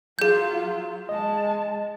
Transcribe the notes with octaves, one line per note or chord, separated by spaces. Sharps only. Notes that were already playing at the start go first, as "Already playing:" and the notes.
F#3 F4 G#4 G6
G#3 D#5 A5